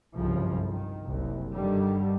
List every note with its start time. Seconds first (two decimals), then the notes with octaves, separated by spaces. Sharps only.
0.16 G1 C2 F#2 C#3 F3
0.69 D#3
1.05 F#1 C2
1.53 G2 D3 D#3 G3